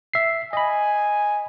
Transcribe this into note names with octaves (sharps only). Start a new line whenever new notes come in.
E5 C7
D#5 G#5 B5